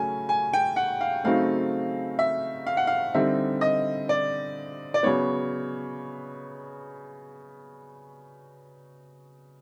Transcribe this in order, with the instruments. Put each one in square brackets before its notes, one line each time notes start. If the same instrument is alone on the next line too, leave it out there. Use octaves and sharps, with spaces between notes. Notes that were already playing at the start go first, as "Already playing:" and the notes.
Already playing: [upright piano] C#3 F#3 A3 C#4 G#5
G#5
G5
F#5
F5
C#3 F#3 A3 C4 D#4 F5
E5
F5
F#5
F5
D3 G3 C4 D#4 E5
D#5
D5
D5
C#3 F#3 B3 C#5